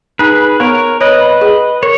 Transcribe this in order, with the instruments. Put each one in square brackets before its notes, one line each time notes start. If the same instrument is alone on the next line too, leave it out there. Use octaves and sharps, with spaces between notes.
[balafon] D#4 [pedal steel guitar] G#4 B4
[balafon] B3 [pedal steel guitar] A#4 C#5
[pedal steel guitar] B4 D#5 [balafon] C#5
[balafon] G#4
[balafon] A#4 [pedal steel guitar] C#5